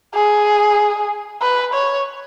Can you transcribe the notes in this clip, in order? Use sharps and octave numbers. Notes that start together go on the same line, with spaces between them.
G#4
B4
C#5